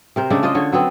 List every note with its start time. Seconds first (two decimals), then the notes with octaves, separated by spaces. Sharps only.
0.16 C3 A#4 C5
0.30 C#3 G#3 A3 D4
0.43 G#3 F4 C5 D#5
0.55 D3 C#5
0.72 F#3 B3 C4